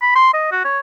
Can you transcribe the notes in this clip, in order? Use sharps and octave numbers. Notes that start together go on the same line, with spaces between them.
B5
C6
D#5
F#4
C#5